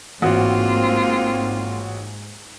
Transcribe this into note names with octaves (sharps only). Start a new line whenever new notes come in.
A1 G#2 A#3 C4 F4 F#4